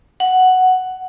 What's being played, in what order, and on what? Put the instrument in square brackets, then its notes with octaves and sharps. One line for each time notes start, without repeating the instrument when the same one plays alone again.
[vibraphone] F#5